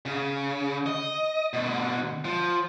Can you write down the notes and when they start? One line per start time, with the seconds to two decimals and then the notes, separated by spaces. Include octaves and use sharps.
0.06 C#3
0.86 D#5
1.54 B2 D3
2.25 F3